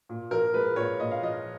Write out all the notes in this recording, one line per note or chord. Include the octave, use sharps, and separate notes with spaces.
A#2
F3 A#4
G#3 B4
A#2 C#5
A#2 D#5
F5
F3 D#5